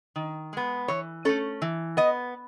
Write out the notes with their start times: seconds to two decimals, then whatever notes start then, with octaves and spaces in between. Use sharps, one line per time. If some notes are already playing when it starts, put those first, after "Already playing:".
0.16 D#3
0.53 G#3 B3
0.88 E3 C#5
1.25 A3 C#4 A4
1.62 E3
1.97 B3 D#5